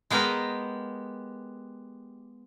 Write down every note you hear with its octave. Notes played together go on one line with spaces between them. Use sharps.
G#3 B3 G4 A#4 D#5